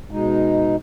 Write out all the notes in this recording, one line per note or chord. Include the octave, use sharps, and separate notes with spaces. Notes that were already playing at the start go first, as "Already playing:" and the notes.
B2 G#3 D#4